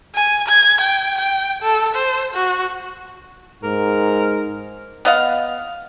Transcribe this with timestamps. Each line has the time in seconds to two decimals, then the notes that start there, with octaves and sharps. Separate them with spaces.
0.15 G#5
0.48 G#6
0.81 G5
1.19 G5
1.62 A4
1.96 C5
2.34 F#4
3.64 G#2 A#4
5.05 B3 D#5 F5